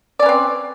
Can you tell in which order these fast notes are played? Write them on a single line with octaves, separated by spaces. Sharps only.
D5 C#4 B4 C4